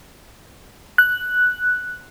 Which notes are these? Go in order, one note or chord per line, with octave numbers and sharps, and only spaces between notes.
F#6